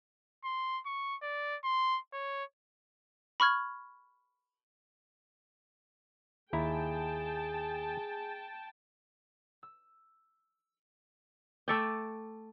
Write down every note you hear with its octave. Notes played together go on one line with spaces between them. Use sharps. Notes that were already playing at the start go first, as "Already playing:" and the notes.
C6
C#6
D5
C6
C#5
B5 C#6 F6 G#6
D#2 E4 G#4 G5 A5 A#5
E6
A3 E5 G5 D6 A6 C#7